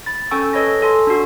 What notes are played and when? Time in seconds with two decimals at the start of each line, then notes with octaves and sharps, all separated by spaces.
0.06 B5 A6
0.31 C#4 A4 G5 G#5 C#6 E6
0.53 A4 B4 C#5 D#5 B5 A#6
0.82 A4 G#5 C6
1.07 D4 F#4